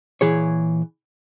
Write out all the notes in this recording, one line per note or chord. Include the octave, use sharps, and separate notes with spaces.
A#2 E3 G#4 C#5